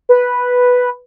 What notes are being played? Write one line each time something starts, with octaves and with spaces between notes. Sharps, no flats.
B4